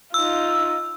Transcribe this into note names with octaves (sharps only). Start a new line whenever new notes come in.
D#4 F4 E6